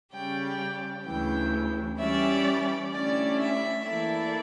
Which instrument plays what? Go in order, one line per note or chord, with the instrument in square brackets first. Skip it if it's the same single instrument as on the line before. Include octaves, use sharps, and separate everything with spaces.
[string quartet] C#3 G3 C#4 G4 D5 [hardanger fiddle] G5
[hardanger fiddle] G5
[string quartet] D2 C#3 E3 [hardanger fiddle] G5
[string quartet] E3 G3 C#4 G4 D5 [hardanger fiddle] E5
[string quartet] D3 A3 C#4 E4 G4 [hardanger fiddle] D5
[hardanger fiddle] E5
[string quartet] E3 A#3 E4 A4 D5 [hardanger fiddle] E5